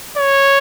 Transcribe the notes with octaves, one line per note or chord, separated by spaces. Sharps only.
C#5